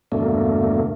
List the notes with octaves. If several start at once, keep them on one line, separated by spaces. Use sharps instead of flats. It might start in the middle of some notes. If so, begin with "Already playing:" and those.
E2 G2 B2 D3 A3 A#3